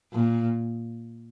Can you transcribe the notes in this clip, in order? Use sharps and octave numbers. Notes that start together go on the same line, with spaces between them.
A#2